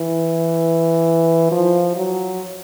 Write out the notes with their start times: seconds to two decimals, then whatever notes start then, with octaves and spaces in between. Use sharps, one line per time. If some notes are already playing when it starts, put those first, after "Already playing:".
Already playing: E3
1.51 F3
1.96 F#3